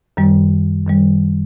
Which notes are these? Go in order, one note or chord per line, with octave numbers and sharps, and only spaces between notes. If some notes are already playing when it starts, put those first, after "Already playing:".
F#2 D#3 G3
F#2 D#3 G3